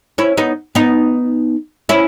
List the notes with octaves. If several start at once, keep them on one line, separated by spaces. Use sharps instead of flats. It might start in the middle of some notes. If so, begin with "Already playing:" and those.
C#4 E4
B3 D#4
B3 D#4
C#4 E4